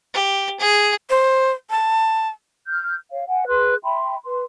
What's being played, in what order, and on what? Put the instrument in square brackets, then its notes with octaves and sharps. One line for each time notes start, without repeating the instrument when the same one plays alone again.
[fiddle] G4
G#4
[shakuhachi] C5
A5
[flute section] F6 G6
C#5 F5
F#5 G#5
G#4 B4 C6 F#6
E5 G5 B5 C6
B4 C6